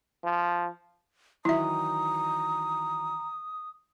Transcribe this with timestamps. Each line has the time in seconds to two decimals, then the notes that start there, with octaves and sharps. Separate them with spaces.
0.24 F3
1.45 D#3 E3 F#3 E4 E5 A#5 D#6